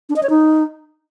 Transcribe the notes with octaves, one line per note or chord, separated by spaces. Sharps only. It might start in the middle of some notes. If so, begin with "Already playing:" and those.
D4
D#5
C#5
D#4